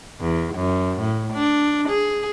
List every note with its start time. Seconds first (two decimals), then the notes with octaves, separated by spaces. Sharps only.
0.20 E2
0.55 F#2
1.00 A2
1.33 D4
1.89 G#4